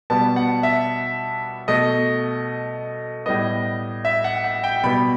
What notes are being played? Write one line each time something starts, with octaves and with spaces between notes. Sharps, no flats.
B2 G3 B3 A5
F#5
E5
B2 A3 D#5
A2 G3 B3 D#5
E5
F#5
F#5
G5
B2 G3 B3 B5